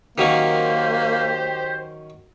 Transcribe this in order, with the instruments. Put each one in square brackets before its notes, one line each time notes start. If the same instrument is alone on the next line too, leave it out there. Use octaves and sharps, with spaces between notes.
[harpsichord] D#3 F#3 C#4 [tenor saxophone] A#3 [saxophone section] G4 C5